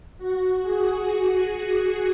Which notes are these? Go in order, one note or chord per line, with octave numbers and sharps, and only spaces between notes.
F#4
G#4